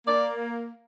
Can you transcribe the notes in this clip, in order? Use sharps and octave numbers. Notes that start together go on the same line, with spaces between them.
A#3 D5